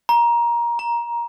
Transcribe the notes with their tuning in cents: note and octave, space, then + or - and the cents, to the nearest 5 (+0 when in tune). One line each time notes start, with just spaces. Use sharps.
A#5 +20
A#5 +10